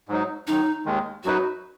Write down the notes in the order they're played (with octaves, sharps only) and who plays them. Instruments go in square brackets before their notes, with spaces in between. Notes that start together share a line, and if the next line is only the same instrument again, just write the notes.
[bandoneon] G#2 F#3 D#4
[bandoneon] F#2 D#3 F#3 [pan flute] D#4
[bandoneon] D#2 D#3 G#3
[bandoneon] F#2 F#3 D#4 B4 [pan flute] F#4